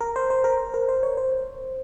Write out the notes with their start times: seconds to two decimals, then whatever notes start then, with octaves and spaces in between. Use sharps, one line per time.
0.01 A#4
0.16 C5
0.30 C5
0.44 A#4
0.74 A#4
0.89 C5
1.03 C#5
1.17 C5